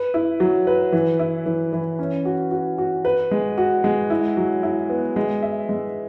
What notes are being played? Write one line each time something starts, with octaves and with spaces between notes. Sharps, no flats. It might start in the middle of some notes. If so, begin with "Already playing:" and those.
Already playing: B4
E4
F#3
B4
E3
E4
E3
E3
C#4
F#4
F#4
F#4
B4
G#3
F#4
G#3
E4
F#3
E4
B3
G#3
E5
G#3